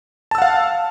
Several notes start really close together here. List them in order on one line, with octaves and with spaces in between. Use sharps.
A5 E6 F#5 F5